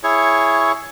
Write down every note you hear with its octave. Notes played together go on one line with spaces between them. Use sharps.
E4 G#4 C#5 C#6